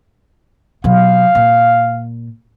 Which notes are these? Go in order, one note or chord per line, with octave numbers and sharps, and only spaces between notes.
B2 F#3 F5
A#2